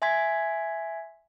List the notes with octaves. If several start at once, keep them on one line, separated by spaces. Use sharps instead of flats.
E5 G#5 C6 G#6 B6